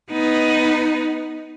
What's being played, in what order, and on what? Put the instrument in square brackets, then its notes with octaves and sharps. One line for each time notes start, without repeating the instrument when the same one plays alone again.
[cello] B3 D#4